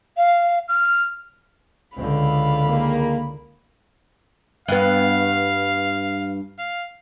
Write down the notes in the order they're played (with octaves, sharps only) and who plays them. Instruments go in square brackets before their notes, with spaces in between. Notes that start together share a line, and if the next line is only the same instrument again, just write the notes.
[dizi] F5
F6
[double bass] C#2 D3 [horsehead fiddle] F5 B5
[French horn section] D#3 G#3 A#3
[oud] G2 B3 [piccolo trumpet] F5
[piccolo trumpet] F5